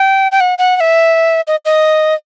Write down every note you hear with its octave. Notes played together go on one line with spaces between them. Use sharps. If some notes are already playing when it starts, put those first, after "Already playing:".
Already playing: G5
G5
F#5
F#5
F#5
E5
D#5
D#5